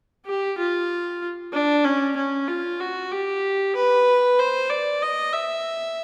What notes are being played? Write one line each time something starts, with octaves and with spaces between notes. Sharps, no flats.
G4
F4
D4
C#4
C#4
F4
F#4
G4
B4
C5
D5
D#5
E5